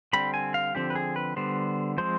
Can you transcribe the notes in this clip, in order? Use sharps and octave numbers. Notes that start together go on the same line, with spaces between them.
D3 G3 C4 B5
G#5
F5
D3 F3 C4 G4
B4
G#4
B4
D3 G3 B3 C5
F3 G#3 C4 C5